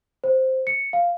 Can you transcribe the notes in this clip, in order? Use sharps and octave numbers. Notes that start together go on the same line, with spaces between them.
C5
C#7
F5